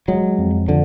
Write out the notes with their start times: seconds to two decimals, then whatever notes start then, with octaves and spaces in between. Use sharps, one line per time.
0.08 F#3 G#3
0.38 F2
0.68 D3 F3